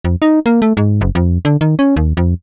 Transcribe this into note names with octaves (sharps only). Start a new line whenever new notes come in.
F2
D#4
A#3
A3
G#2
F#1
F2
D3
D#3
C#4
D#2
F2